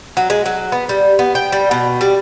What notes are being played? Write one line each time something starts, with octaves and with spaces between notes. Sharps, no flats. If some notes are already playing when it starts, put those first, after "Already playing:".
F#3
G#3
F#3
B3
G3
B3
G5
G3
B2
G3